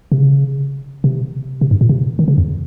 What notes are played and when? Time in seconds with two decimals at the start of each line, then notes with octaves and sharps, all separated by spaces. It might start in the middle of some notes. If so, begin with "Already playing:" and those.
0.12 C3
0.18 C#3
1.04 C3
1.61 C3
1.71 G2
1.81 A#2
1.89 C3
2.19 D#3
2.28 C#3
2.38 F2